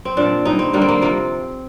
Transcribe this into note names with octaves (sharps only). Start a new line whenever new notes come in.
C4
A#2 F3 D4
D3 G3 D#4
C4
D3 G3 A#3
C4
A#3
C3 F3 A#3